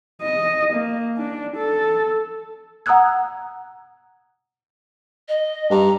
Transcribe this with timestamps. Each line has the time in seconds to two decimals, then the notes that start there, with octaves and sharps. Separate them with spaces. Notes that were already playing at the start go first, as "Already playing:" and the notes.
0.22 D#5
0.73 A#3
1.19 D4
1.57 A4
2.86 F#5 A#5 D#6 E6 F#6 G#6
5.28 D#5
5.71 G2 A#5